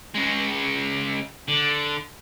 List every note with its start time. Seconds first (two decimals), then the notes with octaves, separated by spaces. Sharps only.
0.14 C#3 G#3
1.48 D3